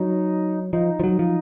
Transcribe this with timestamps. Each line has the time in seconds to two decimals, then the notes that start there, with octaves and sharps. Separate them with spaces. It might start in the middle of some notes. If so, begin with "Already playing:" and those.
Already playing: F#3 D#4
0.73 F3 D#4
1.00 F3
1.04 F#3
1.19 F3